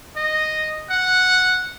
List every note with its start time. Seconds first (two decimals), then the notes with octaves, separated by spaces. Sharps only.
0.16 D#5
0.90 F#5